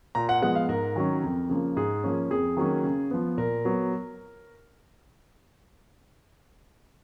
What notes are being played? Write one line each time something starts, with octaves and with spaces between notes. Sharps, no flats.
A#2 A#5
F#5
F3 G#3 B3 F#5
F5
G#2 A#4
D#3 F#3 C#4
F2
C#3 F3 A#3
G#2 G#4
F3 A#3 C#4
F2 G#4
D#3 F#3 A#3 C#4
C#3
F3 B3
A#2 A#4
F#3 B3